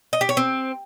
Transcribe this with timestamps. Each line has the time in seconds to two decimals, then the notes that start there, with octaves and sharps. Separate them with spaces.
0.13 D#5
0.21 G4
0.29 C#5
0.37 C4